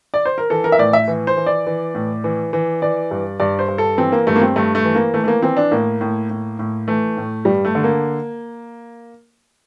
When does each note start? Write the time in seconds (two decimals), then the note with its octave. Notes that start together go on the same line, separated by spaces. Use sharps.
0.14 D5
0.25 C5
0.38 A#4
0.50 E3 A4
0.64 A#4
0.72 E5
0.79 A2 D5
0.93 E5
1.08 E3
1.27 C5
1.37 E3
1.46 D5
1.66 E3
1.95 A2
2.24 E3
2.53 E3
2.82 E3 D5
3.11 G2
3.40 G2 D5
3.59 C5
3.68 G2
3.78 A4
3.97 E3 C4
4.12 A#3
4.27 G2 A3
4.36 A#3
4.42 C4
4.56 G2 A3
4.75 A3
4.85 E3
4.95 A#3
5.14 E3 A3
5.24 A3
5.28 A#3
5.43 E3 C4
5.57 D4
5.71 A2 A#3
6.01 A2
6.30 A2
6.59 A2
6.88 E3 A3
7.17 A2
7.45 G2 G3
7.65 A3
7.75 D3
7.84 A#3